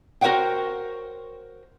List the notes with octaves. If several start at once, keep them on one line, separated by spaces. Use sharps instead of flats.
F#4 A#4 C5 C#5 F#5 G5